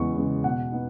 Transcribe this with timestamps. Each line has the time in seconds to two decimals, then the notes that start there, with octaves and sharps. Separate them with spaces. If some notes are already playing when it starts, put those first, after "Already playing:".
Already playing: E2 C#3 G#3 B3 C#6
0.17 C#3 G#3 B3
0.44 B2 F#5
0.72 B3 D#4